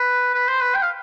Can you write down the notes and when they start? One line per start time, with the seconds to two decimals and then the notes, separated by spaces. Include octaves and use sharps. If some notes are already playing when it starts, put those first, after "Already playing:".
Already playing: B4
0.34 B4
0.48 C5
0.61 B4
0.75 G5
0.82 F5